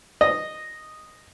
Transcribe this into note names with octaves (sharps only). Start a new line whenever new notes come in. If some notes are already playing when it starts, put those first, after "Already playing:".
D#5